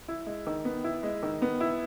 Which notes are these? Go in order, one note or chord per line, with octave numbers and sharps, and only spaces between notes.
E4
G#3
D#3
B3
E4
G#3
D#3
B3
E4